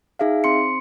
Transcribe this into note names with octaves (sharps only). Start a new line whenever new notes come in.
D#4 G#4 E5 F5
C4 C6 C#7